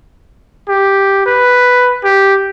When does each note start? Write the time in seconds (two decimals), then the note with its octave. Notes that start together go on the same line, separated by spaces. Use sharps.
0.68 G4
1.26 B4
2.04 G4